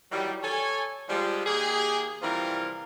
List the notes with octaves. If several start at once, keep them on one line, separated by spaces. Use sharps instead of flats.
D#3 E3 F#3 G3
A4 C#5 G#5
F3 G3 G#3
D#3 A#3 G4 G#4
C3 E3 F3 G3 F4 A#4